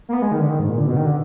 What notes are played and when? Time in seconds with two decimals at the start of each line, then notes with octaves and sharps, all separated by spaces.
0.09 A#3
0.13 B3
0.22 G#3
0.31 D#3
0.40 D3
0.50 D#3
0.59 G#2
0.69 A#2
0.78 D3
0.87 B2
0.96 D#3
1.06 D3